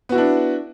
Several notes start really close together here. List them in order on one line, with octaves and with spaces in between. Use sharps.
B3 F#4 E4 D4